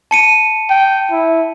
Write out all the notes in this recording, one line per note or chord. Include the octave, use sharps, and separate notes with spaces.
A5 C#7 D#7
G5
E4